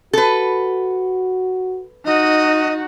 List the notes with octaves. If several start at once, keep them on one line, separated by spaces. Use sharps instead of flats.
F#4 A4 B4
D#4 F#4 D#5